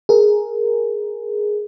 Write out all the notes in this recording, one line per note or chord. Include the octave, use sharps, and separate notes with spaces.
G#4 A#4